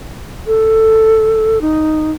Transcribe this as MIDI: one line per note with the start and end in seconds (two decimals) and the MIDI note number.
0.46 1.59 69
1.61 2.11 63